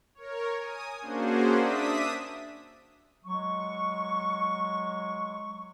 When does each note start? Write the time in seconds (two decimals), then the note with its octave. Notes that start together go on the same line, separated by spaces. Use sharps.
0.15 A#4 C#5
0.58 G#5 D#6
1.01 A#3 C#4 D4 F#4 G#4 C5
1.59 D4 E5 D#6 B6
3.25 F#3 G#3 C#6